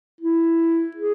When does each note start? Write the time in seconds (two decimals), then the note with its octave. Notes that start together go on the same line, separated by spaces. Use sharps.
0.21 E4
0.97 G#4